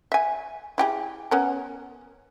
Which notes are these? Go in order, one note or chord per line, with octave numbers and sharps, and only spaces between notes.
E5 G#5
E4 G4 G#4
B3 C#4 A#4